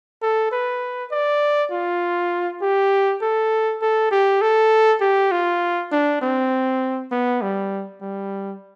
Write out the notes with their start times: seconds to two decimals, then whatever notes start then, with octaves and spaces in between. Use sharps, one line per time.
0.22 A4
0.51 B4
1.12 D5
1.72 F4
2.62 G4
3.22 A4
3.82 A4
4.11 G4
4.42 A4
5.01 G4
5.32 F4
5.92 D4
6.22 C4
7.11 B3
7.42 G3
8.01 G3